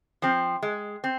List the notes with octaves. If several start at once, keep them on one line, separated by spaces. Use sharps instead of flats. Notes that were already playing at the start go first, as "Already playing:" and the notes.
F3 C4
G#3
C4